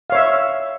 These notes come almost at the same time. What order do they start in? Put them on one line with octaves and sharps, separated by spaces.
F5 C#5 E5